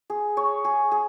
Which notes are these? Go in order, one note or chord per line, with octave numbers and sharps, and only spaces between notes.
G#4
C#5
G#4
G#4